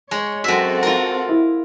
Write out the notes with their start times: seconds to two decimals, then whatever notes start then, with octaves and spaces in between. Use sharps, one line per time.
0.11 G#3 C#5
0.44 F#2 C4 F#4 A4 E5
0.83 F4 A#4
1.29 E4